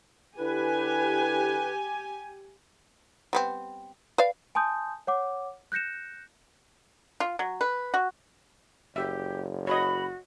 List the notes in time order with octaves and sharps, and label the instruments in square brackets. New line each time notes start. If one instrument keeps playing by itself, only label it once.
[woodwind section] D3 E4 B4 [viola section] G4 G#5
[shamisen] G3 B3 C4
B4 D5 F5
[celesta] G#5 A5 C6 D#6 G6
C#5 F#5 D6
F#6 G6 A#6 C#7 E7
[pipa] F4
F#3
B4
F#4
[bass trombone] F#1 [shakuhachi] G4 [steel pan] E5
[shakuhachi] F#4 [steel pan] C#5 D#5 [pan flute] B5